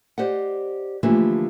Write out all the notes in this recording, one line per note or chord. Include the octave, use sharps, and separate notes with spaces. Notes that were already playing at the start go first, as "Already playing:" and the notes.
G4 C5 D5 D#5 F#5
D3 E3 F3 A3 A#3 G4